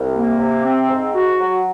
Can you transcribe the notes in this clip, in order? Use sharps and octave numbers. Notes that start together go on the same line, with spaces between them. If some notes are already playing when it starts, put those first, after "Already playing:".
Already playing: C2
A#3
C3
C4
G#2
F#4
F#3